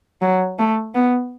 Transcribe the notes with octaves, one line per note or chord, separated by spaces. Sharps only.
F#3
A3
B3